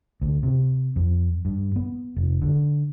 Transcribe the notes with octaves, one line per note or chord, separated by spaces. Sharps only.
D2
C3
F2
G2
B3
F1
D3